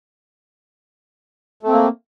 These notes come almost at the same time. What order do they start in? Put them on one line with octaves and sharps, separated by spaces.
A3 C4 A#3